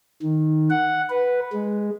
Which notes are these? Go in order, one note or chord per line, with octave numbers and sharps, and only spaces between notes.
D#3
F#5
B4
G#3